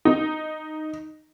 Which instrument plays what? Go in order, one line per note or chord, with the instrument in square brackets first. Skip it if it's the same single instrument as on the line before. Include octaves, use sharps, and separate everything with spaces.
[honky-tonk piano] D#4